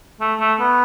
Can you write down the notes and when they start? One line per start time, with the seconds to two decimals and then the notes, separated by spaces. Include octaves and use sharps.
0.20 A3
0.40 A3
0.59 B3